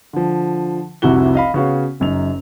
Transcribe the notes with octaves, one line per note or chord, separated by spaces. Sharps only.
D3 F3
F1 C2 C3 E4 F#4 G7
D#5 F5 B5
C#3 B3 F#4 C#5 F5
F#1 F#2 D#4 F7